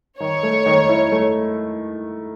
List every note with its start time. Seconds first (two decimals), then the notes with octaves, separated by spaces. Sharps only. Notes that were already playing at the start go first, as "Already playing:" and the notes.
0.20 D#3 C#5
0.43 A3
0.66 D#3
0.89 E4
1.12 A3